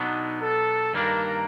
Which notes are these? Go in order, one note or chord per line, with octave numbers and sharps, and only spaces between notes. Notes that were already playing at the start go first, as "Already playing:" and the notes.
Already playing: B2 F#3 B3 D4 D#4
A4
G2 D#3 G3 A#3 D4 A#4